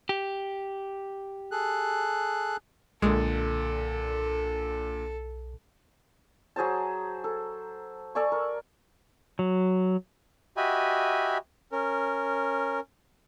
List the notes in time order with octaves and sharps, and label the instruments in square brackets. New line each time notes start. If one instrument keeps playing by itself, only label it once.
[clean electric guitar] G4
[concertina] G#4 A4 F#6
[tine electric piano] B1 [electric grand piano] A#2 D3 [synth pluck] G#3 [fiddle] A4
[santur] F#3 G#4 C5 A5
A4
A4 D5 G#5 C#6
A#4
[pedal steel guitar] F#3
[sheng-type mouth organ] F#4 G4 D#5 E5 G#5 B5
C#4 A#4